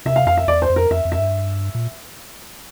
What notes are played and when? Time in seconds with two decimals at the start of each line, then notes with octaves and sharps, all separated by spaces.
0.05 C3 E5
0.16 F5
0.26 F2 F5
0.37 E5
0.47 E2 D5
0.62 C5
0.70 F2
0.76 A#4
0.91 F2 E5
1.05 F2
1.12 E5
1.19 G2
1.75 A#2